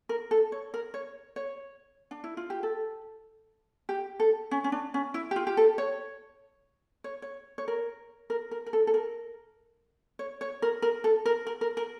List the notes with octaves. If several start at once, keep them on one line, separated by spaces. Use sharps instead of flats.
A#4
A4
C#5
A#4
C#5
C#5
D4
E4
F4
G4
A4
G4
A4
C#4
C#4
D4
C#4
E4
G4
F4
G4
A4
C#5
C#5
C#5
C#5
A#4
A#4
A#4
A#4
A4
A4
A#4
C#5
C#5
A#4
A#4
A4
A#4
A#4
A#4
A#4